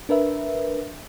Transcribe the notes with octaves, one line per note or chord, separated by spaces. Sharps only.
D4 A#4 B4 E5